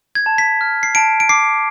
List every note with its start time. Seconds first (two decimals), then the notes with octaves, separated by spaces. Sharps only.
0.15 G#6
0.26 A5
0.38 B6
0.61 F6
0.83 C7
0.95 A5 D7
1.20 D7
1.29 D6 C7